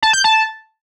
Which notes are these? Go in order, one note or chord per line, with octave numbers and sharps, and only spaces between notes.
A5
G6
A5